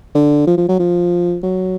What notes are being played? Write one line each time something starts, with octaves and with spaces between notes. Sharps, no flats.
D3
F3
F3
F#3
F3
F#3